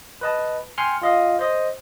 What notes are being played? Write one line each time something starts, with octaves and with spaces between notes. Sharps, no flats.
B4 D#5 A5
G5 G#5 C6 F6 C#7
F4 D#5 F5
C5 D#5